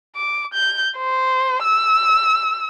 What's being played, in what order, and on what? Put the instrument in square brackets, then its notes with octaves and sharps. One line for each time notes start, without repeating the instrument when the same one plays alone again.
[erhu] D6
G6
C5
E6